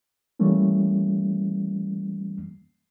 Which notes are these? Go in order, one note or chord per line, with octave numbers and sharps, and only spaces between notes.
E3 G3 A3 A#3 C#4